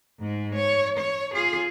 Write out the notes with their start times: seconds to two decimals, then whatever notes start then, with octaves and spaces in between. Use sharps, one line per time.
0.20 G#2 G#3
0.55 C#5
0.98 C#5
1.34 F4 G#4